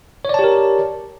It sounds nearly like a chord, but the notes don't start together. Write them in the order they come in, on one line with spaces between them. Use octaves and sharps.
C#5 D5 A5 G4 A#4